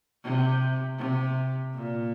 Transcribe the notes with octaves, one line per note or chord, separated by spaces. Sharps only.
C3
C3
A#2